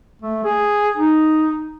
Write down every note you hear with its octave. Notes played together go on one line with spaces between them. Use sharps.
A3
G#4
D#4